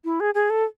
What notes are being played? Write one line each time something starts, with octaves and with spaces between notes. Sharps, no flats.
E4
G#4
G#4
A4